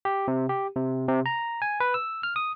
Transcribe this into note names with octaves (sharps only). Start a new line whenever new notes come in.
G4
C3
G4
C3
C3
A#5
G#5
B4
E6
F6
D#6